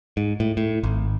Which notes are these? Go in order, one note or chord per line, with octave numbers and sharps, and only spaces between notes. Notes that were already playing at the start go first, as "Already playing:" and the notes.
G#2
A2
A2
G#1